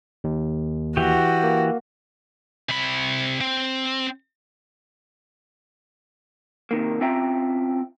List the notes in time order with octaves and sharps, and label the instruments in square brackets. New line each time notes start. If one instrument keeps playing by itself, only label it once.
[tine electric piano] D#2
[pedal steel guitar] E3 G4 [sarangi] F#4
[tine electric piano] A#3
[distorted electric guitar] C3 B5
C4
[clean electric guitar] C3 D#3 A#3
C4 C#4 F4 E5 G5 A#5